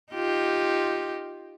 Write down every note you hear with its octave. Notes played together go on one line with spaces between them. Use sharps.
D#4 F4 G4